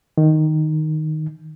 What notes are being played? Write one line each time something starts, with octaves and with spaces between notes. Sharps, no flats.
D#3